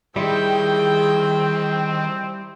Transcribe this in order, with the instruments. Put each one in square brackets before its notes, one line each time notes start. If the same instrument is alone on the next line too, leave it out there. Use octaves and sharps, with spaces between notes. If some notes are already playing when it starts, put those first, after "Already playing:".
[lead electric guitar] D#3 [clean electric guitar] G3 E4 [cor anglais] C4 [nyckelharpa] G#4 G5